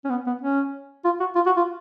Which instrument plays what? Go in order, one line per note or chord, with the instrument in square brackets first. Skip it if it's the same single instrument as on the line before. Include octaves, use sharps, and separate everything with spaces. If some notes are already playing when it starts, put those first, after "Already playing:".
[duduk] C#4
B3
B3
C#4
F4
F#4
F4
F#4
F4